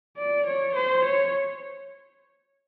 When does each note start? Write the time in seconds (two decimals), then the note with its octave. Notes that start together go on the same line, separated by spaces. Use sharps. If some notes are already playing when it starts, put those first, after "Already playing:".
0.17 D5
0.47 C#5
0.76 C5
1.05 C#5